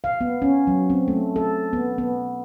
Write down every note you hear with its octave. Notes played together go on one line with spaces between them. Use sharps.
F5
B3
C#4
F#3
C4
A3
A4
B3
B3